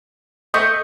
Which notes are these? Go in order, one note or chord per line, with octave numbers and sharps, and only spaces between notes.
A3 D#5 C#6 G6